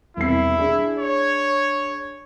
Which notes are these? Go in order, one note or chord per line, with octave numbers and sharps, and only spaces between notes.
E1 C2 E4 C7
D4 G#4
C#5